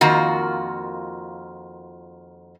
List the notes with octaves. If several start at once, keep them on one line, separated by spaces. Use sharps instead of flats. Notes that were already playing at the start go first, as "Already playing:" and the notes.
F2 D#3 A#3 F4 F#4